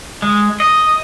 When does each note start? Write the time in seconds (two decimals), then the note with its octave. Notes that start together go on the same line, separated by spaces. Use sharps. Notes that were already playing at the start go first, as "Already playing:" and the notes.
0.22 G#3
0.60 D#5